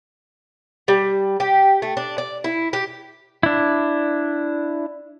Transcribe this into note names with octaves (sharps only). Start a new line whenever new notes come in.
G3
G4
A3
D4
D5
E4
G4
D4 E4